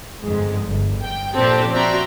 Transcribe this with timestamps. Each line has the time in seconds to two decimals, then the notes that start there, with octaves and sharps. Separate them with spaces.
0.22 G1 F2 G#2 G#3
0.64 G1
1.02 G5
1.35 A#2 F3 C4 D4 G4 A4
1.72 C4 F#4 D5 E5 A#5 C6